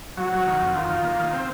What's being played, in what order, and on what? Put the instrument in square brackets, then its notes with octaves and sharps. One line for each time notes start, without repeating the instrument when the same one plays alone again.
[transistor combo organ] F#3 [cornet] F#4
[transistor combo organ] F#3
D#3
F2
[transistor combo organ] D#3 [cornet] F4
[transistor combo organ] D#3
A#3
D#3
C4